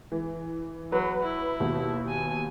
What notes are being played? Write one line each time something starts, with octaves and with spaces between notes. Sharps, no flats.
E3
F#3 B4
E4
D#2 B2
G#5